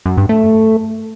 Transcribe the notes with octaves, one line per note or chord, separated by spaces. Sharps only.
F#2
G2
A3